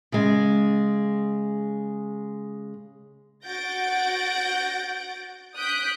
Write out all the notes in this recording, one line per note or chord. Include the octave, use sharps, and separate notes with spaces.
C#3 G#3
F#4 F#5 G6 A6 A#6 D7
D#6 F#6 G6 B6 D7